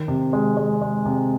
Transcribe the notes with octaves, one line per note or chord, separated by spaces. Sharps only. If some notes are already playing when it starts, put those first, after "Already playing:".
Already playing: D#3
C3
G#3
G#3
G#3
C3